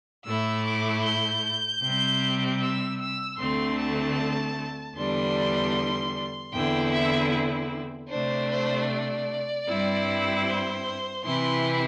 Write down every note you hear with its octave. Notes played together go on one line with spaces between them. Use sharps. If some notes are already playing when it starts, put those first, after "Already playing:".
A2 A3 E4 E6
D6
G6
C3 G3 C4
E6
E6
D2 D3 A3 C4 C6
A5
E2 D3 G3 D4 C6
E2 D3 C4 E4 G5
E5
C3 A3 D4 C5
C5
D5
G2 G3 C4 E4
C5
C3 E3 C4 E4 C6